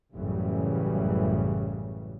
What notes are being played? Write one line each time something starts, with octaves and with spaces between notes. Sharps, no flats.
A1 F#2 C#3 E3 G3